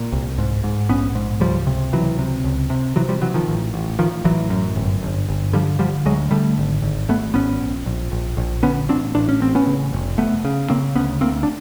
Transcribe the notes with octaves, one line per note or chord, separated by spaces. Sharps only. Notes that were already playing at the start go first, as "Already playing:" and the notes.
Already playing: A#2
C2
G#2
G#2
A#1 B3 C#4
G#2
C#2 F3 G3
C3
C#2 E3 F#3
C3
C#2
C3
C3 E3 F#3
F3 G3
C3 E3 F#3
D#3 F3
A1
A1
A1 D#3 F3
A1 E3 F#3
F#2
G1
G1
G1
D3 F3 G3
D3 F3 G3
D2 F#3 G#3
D3 G3 A3
G#1
G#1
G#1 A3 B3
G#1 B3 C#4
A#1
A#1
A#1
A#1
D3 B3 C#4
A1 C4 D4
A1 D4
C#4
A1 C4
B3 C#4
C#3
F1
F1 A3 B3
C#3
C#3 A#3 C4
D2 B3 C#4
D2 A#3 C4
D4